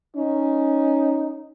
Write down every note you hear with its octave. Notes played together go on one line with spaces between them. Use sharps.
C#4 D#4